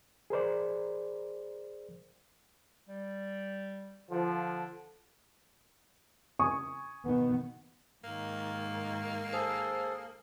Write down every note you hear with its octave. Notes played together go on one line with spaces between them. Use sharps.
G#4 A#4 C5 D5
G3
D3 F3
G#5 C#6 D#6
B2 D#3 B3
G#2 D#3 A#3
G#4 A4 C5